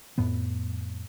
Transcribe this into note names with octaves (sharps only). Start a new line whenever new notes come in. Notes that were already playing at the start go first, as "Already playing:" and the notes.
F2 A2 B3